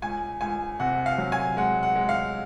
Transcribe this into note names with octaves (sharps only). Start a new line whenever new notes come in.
C#2 G#5
C#2 G#5
C3 F#5
F5
F#3
G#5
G#3 F#5
F#5
G#3
F5